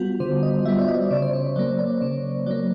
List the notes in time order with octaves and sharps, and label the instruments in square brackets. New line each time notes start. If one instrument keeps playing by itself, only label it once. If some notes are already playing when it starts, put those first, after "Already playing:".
Already playing: [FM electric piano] G3 B3 F4 F#4
D3 C5
D#5
G3 E5
B3
D5
D#5
C#3 D5
C5
C#5
F#3 D5
A#3
D5
C#3 C#5
F#3 A#3 D5